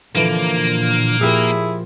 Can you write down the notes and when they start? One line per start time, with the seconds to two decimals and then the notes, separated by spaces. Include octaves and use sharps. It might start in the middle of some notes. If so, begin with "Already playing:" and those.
0.15 A#2 D3 E3 F3 A#3
1.21 F3 E4 G4 G#4 A#4